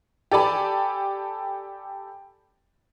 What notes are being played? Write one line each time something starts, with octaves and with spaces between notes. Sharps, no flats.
G4 A4 D5 G#5 A5 B5